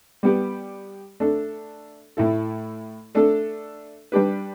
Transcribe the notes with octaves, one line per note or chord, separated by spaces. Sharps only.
G3 B3 G4
A3 D4 A4
A2 A3 E4 A4
A3 D4 A4
G3 D4 G4 B4